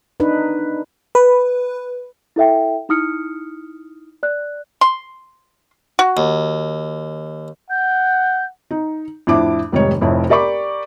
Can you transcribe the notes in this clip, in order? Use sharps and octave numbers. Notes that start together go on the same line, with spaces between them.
D4 D#4 B4
B4
E4 A4 E5 G5
D#4 E4 D#6 F6 C#7
D5 F#6
C6
F#4
D#2
F#5 G6
D#4
F2 A2 D4 E4 E5 D6
F1 G#2 D#3 G3 D#4 C#5
F1 F2 E4 C#5
G4 A#4 D5 B5 C#6 D6